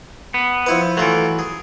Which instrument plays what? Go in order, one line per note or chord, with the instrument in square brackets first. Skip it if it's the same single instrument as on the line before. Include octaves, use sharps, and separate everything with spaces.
[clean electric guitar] B3
[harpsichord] F3 E4 B4
[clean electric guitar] E3 F#3 [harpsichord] A3 F4
[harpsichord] G#4